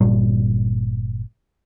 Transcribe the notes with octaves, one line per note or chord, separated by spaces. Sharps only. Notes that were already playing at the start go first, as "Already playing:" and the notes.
G1 A#2 G3